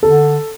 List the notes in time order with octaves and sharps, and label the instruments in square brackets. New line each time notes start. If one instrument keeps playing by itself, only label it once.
[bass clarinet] D3 [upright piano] A4